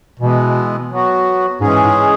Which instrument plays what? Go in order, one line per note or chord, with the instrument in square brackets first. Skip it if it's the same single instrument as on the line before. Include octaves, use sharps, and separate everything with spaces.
[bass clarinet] B2 [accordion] E3 G#3 B3
[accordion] F#3 B3 F#4
[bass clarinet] G#2 [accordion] E3 G#3 C#4 G#4
[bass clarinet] G#2